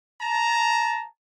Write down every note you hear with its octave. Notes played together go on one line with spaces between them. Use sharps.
A5 A#5